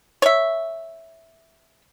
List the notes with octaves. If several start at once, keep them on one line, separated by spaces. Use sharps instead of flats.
C#5 E5